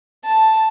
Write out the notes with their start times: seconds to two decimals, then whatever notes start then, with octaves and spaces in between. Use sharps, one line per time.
0.25 A5